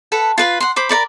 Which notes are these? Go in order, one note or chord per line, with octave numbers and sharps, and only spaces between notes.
A4 B4 F#5
F4 B4 F5
F#5 C6
C5 B5 D6
A#4 C#5 D5 B5